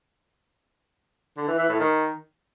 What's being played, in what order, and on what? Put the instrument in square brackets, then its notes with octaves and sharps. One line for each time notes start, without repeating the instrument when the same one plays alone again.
[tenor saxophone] D3
E3
E3
A2
D#3